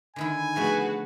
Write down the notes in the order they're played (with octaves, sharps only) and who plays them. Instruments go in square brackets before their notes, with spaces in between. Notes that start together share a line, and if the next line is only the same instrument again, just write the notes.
[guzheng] D3 D#3 E4 [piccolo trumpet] G#5
[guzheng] F3 A3 B3 [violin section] F#4 G#4 B4